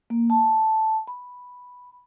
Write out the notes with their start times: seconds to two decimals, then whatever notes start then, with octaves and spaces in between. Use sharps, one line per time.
0.10 A#3
0.30 A5
1.07 B5